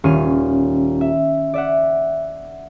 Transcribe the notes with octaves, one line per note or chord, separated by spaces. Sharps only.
D#1 C#4 F6 D#7
E5
D5 E5 F#5